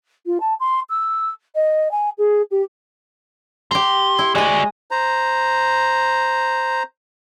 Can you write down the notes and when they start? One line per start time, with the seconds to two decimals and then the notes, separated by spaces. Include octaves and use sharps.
0.26 F4
0.41 A5
0.60 C6
0.90 E6
1.55 D#5
1.91 G#5
2.18 G#4
2.51 G4
3.71 G4 A#5 C6
4.19 E4
4.35 G#3 F#4 D5 D#5
4.91 C5 A#5